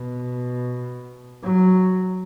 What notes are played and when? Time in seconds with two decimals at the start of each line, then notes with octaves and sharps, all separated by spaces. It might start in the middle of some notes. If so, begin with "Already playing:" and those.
Already playing: B2
1.44 F#3